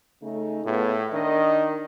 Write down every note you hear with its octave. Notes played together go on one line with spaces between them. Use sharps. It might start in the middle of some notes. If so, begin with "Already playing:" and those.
C#3 A3 D#4
A2 B3 F4 G#4
D#3 D4 D5 D#5